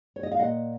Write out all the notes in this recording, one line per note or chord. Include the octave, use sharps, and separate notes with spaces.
C#5
D#5
F5
A#2 D#5 F#5